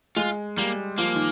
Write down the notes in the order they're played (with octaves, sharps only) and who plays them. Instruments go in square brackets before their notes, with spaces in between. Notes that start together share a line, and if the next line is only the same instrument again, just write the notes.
[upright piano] G#3 [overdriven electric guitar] F4
[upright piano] G3 [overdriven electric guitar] A#3
[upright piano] F3 [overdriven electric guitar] A#3
[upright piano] D#3